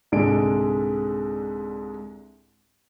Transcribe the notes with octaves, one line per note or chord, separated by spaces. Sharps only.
C2 G#2 D3 G#3 D4 D7